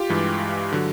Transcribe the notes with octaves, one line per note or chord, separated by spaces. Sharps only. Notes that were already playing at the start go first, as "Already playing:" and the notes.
Already playing: F4 G4
G2 E3 G#3
D3 F#3